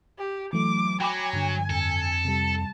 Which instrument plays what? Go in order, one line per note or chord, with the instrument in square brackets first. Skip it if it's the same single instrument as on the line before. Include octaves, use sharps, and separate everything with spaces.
[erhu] G4
[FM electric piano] E3 F#3 A3 [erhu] D6
[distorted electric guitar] F#3 [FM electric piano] G5 B5 D6 [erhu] G#5
[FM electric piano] G2 D3
[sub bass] F2 [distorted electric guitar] A4
[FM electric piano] C3 G3 [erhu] A5